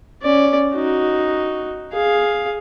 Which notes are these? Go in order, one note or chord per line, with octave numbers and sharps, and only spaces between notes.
C#4 D5
D#4 F#4
G#4 F5